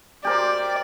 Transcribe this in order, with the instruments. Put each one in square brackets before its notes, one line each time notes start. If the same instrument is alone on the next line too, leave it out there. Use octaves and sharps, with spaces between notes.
[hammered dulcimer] G4 A#4 C5 [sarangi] D5